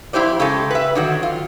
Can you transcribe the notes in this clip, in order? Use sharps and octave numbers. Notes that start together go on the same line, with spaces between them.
F2 E4 G4 C5 D5
C#3 G#3 G4 A4
B4 E5
D3 D#3 F#3
F4